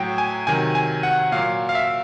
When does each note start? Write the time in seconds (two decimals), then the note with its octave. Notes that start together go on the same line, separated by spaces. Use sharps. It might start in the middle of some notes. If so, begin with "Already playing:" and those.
Already playing: A2 F#3 G5
0.18 G#5
0.47 C3 D#3 F#3 G#5
0.75 G#5
1.03 F#5
1.32 A#2 F#3 F5
1.69 F5
1.75 E5